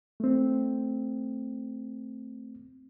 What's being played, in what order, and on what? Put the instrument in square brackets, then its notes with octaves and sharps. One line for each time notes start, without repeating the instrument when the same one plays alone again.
[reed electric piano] A3 C4